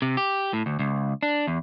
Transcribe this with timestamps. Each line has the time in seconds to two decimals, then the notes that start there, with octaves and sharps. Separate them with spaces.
0.02 C3
0.17 G4
0.53 A2
0.66 D2
0.79 C#2
1.23 D4
1.47 E2